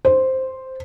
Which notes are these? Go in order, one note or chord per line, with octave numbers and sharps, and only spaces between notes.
C5